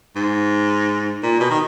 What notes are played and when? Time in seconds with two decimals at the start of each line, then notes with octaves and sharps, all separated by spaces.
0.16 G#2
1.23 A#2
1.40 B2
1.50 D#3